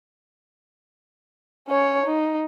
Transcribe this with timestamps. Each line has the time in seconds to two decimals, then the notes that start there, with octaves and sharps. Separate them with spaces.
1.68 C#4 C#5
2.06 D#4